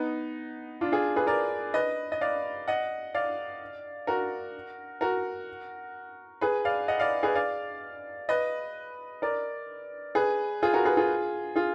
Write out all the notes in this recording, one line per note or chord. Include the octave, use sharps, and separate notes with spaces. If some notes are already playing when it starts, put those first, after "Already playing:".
Already playing: B3 D#4
D4 F4
F4 G#4
G#4 B4
A#4 D5
B4 D#5
D#5
D5 F5
D#5 F#5
D5 F5
F#4 A#4
F#4 A#4
G#4 B4
D5 F5
D#5 F#5
D5 F5
G#4 B4
D5 F5
B4 D#5
A#4 D5
G#4 B4
F4 G#4
F#4 A#4
G#4 B4
F4 G#4
F4 G#4